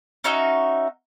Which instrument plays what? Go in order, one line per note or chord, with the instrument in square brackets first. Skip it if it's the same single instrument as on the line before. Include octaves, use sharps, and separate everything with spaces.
[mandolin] C#4 D#4 F#4 E5